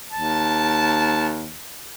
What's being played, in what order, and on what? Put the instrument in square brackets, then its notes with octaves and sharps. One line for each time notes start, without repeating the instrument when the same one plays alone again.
[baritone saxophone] D#2 [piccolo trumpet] A5